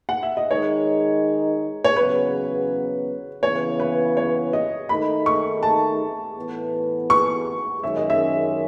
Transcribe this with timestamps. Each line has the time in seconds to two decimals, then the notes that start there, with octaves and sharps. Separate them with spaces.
0.09 F#5
0.23 E5
0.37 D#5
0.50 D#3 G#3 D#4 C#5
1.84 C#5
1.96 E2 C#3 F#3 B3 B4
3.43 C#3 E3 B3 C#5
3.80 B4
4.17 C#5
4.53 D#5
4.89 D#3 A3 D#4 B5
5.26 C#6
5.63 A5
6.37 A2 E3 B3
7.10 C#6
7.82 F#2 D#3 G#3 C#4 E5
7.97 D#5
8.10 E5